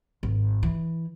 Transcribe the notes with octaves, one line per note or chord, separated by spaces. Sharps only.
G#1
E3